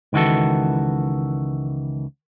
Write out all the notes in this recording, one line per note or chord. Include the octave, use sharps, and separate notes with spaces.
C#2 D#3 E3 F#4 A4